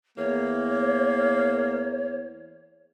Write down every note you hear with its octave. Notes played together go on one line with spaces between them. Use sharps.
E2 A#3 C#5